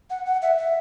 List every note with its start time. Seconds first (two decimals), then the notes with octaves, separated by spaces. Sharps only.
0.10 F#5
0.26 F#5
0.42 E5
0.58 E5